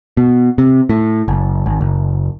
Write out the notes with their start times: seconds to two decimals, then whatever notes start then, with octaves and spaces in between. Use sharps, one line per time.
0.17 B2
0.58 C3
0.89 A2
1.28 F#1
1.66 G#1
1.81 F#1